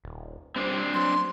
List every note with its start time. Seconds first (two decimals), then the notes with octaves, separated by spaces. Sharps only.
0.04 D#1
0.56 G3 C4 D4 C5
0.94 F#3 C6